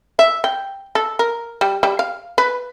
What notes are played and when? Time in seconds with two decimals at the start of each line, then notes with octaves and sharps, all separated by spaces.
0.19 E5
0.44 G5
0.95 A4
1.19 A#4
1.61 G3
1.83 G3
1.99 F5
2.38 B4